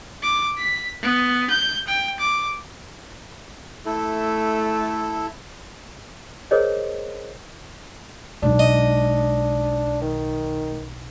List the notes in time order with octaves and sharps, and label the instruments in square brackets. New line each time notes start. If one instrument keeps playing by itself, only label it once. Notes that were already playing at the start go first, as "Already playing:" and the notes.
[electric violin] D6
B6
B3
G6
G5
D6
[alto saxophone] A3 [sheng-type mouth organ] E4 A4
[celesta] G#4 A#4 C5 C#5 D#5
[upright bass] B1 G#3 [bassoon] D4
[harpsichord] D#5
[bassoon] D#3